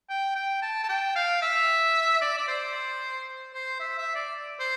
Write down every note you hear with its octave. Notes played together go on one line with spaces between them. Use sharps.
G5
G5
A5
A5
G5
F5
E5
D5
D5
C5
C5
E5
E5
D5
C5